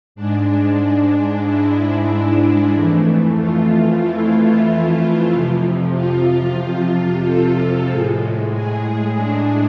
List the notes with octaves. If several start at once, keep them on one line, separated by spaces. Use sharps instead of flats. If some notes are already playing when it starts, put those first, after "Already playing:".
G#2 G#3 D4
E4
E4
E4
F2 E3 A3
F4
E4
E4
F2 C3 F3
F4
A4
A2 G#3
G#4
D4